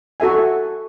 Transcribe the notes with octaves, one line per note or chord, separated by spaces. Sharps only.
F#4 A4 E5 G#5